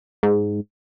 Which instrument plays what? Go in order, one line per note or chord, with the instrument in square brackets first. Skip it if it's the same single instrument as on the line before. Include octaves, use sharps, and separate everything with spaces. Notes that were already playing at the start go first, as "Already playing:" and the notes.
[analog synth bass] G#2